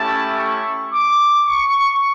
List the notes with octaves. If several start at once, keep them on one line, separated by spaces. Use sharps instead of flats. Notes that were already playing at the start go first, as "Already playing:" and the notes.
Already playing: A3 C#4 E4 G4 A5
C#6
D6
C#6